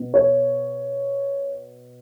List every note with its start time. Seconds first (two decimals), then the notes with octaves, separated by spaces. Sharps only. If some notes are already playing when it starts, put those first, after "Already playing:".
Already playing: B2 B3
0.14 C#5